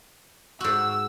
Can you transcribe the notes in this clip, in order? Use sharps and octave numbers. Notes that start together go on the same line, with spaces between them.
G#2 F#4 E6